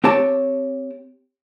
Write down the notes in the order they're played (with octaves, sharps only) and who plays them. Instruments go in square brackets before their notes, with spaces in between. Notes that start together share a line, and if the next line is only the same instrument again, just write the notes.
[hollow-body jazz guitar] C4 G4 C#5 A5